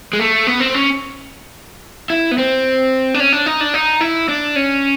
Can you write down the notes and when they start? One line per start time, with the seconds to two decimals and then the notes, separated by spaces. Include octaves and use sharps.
0.13 G#3
0.19 A3
0.47 B3
0.60 C4
0.74 C#4
2.10 E4
2.31 B3
2.38 C4
3.14 D4
3.20 C#4
3.33 D4
3.46 D#4
3.60 D4
3.74 D#4
4.01 E4
4.29 D4
4.56 C#4